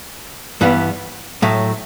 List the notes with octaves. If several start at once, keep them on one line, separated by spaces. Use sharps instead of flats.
G2 E3 G3 B3
A2 F#3 A3